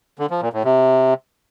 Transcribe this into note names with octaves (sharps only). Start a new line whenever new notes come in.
D3
F3
A#2
A2
C3